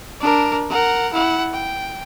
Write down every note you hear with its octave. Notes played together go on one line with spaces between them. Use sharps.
D4 A#4
A#4 F#5
E4 F#5
G5